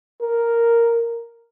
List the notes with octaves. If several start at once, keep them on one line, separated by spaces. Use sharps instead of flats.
A#4